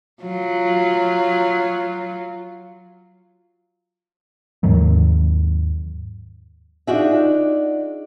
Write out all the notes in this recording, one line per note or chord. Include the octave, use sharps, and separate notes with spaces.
F#3 F4
D#2 G#2 D#3 F#3
D4 D#4 F4 F#4 G#4 E5